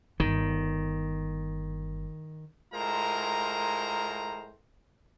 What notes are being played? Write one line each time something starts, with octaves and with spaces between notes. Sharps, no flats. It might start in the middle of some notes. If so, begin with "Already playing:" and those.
G1 D#3
A2 G#3 F4 A#4 C5 A#5